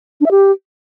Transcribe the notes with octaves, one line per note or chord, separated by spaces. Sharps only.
D4
E5
G4